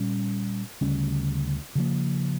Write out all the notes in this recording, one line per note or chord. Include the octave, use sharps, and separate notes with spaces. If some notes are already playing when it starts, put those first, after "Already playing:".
Already playing: A#2 G3 C#4
D2 C#3 G3 C#4
C#3 F3 A#3